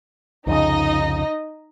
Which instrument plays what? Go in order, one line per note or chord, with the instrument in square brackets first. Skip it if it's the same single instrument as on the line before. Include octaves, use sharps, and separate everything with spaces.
[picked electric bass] C2 F2 C#3 [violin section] D#4 D#5